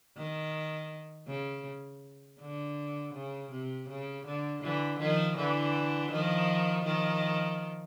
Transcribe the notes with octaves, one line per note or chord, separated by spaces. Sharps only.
D#3
C#3
D3
C#3
C3
C#3
D3
D3 E3
D#3 F3
D3 E3
D#3 F3
D#3 F3